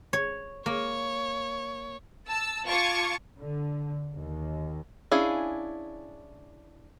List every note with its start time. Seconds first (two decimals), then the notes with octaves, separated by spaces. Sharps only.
0.13 C#5
0.66 A#3 C#5
2.28 A5 E6
2.67 F4 A5 C#6 D6 G#6
3.40 D3
4.16 D#2
5.12 C#4 D4 E4 G#4 F5